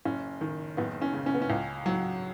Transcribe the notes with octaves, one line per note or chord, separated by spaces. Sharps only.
F#1 C#4
D#3
F#1 B3
C#4
C#3
C#4
B3
C#4
C#2
F#3